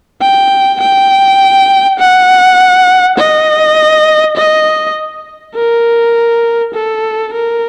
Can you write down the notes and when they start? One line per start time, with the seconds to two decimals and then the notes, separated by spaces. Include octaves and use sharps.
0.21 G5
0.81 G5
1.99 F#5
3.18 D#5
4.37 D#5
5.55 A#4
6.74 A4
7.33 A#4